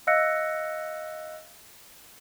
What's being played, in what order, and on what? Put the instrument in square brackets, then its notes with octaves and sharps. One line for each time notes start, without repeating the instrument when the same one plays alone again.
[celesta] D#5 F5 E6 F#6 A#6 C#7